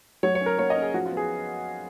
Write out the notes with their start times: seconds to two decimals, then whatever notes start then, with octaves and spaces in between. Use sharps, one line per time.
0.23 F#3 C#5
0.35 C#5
0.41 C#4
0.46 A#4
0.58 A#3 C#5
0.70 D#5
0.77 C#4
0.82 G#4
0.94 F3 F#4
1.06 F4
1.11 B3
1.17 G#4